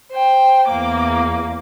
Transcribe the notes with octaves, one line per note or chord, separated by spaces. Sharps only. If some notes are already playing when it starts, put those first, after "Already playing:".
C5 G5
E2 A#3 D6